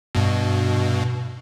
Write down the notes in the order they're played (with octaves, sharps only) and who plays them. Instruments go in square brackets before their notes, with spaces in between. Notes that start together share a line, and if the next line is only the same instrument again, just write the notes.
[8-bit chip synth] G2 B2